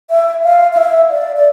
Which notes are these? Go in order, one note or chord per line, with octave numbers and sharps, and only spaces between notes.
E5
F5
F5
E5
D5
D5